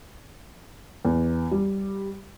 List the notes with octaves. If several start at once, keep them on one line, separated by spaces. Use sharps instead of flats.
E2
G3